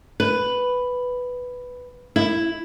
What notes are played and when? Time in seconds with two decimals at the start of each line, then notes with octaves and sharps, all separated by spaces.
0.20 B4
2.16 E4